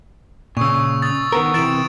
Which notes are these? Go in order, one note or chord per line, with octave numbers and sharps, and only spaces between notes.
A#2 C#3 C#6 D#6 E6
D#6 A6
D#3 B3 A#4
C3 E3 A6 D7 E7